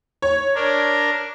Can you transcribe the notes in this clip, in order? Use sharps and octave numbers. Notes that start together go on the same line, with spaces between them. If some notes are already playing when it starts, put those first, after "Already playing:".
C#5
D4 A#4